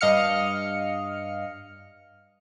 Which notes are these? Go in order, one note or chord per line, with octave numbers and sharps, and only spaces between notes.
G2 D#5 F5 F6 C#7